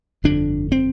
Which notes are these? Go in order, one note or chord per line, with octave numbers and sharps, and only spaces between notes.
G1 F2 D3 D4
C4